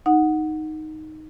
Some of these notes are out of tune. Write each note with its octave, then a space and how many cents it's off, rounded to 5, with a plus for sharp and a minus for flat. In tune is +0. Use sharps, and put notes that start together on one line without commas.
D#4 +0 F#5 -5